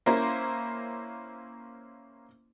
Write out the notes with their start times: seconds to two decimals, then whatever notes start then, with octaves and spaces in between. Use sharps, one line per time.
0.06 A#3 C#4 E4 A#4 C5